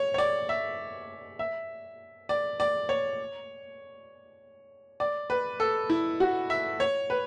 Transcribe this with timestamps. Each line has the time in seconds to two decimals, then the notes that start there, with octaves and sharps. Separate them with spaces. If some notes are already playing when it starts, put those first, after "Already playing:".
Already playing: C#5
0.14 C#5
0.18 D5
0.49 E5
1.39 E5
2.29 D5
2.60 D5
2.89 C#5
5.00 D5
5.30 B4
5.60 A4
5.90 E4
6.20 F#4
6.50 E5
6.80 C#5
7.10 B4